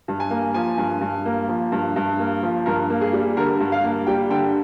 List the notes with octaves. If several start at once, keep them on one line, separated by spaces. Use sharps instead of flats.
G2
G#5
A#3
F3 G#5
G2
G2
A#3
F3
G2
G2
A#3
F3
G2 A#4
A#3
G#4
G3
D3 A#4
G2
F5
A#3
G3 G5
D3 G5